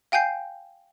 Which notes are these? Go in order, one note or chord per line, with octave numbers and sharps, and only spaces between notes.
F5 G5 G#5 G6 C7